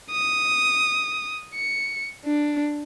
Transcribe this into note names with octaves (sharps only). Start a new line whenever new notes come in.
D#6
C#7
D4